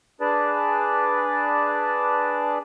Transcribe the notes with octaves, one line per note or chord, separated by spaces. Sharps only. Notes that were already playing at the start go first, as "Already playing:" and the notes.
D4 G#4 B4 D5 A5